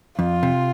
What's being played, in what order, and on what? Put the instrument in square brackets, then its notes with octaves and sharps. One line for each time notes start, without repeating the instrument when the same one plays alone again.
[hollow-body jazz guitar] F2 [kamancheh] F4
[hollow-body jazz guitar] C3